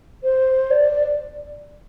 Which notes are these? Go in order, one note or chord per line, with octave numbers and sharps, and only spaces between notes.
C5
D5